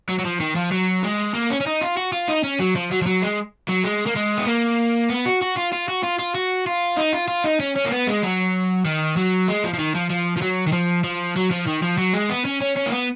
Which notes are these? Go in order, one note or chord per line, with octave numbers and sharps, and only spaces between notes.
F#3
F#3
F3
D#3
F3
F#3
G#3
A#3
C#4
C#4
D#4
F4
F#4
F4
D#4
C#4
F#3
F3
F#3
F3
F#3
G#3
F#3
G#3
A#3
G#3
B3
A#3
B3
F#4
F#4
F4
F4
F#4
F4
F4
F#4
F4
D#4
F4
F4
D#4
C#4
C#4
A#3
B3
G#3
F#3
D#3
F#3
G#3
F3
F3
D#3
F3
F3
F3
F#3
D#3
F3
F3
F#3
F3
D#3
F3
F#3
G#3
B3
C#4
C#4
C#4
A#3
B3